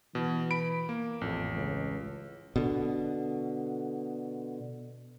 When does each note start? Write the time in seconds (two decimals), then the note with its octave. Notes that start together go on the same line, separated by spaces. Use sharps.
0.15 B2 E3
0.51 B5 D7
0.89 A#3
1.21 A1 F2
1.55 C#2
2.56 B2 D3